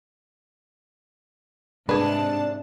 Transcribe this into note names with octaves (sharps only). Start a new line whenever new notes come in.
G#2 C3 D4 G#4 B4 A5